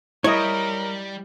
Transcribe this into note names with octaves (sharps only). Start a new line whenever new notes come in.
G3 E4 A#4 C#5 D#5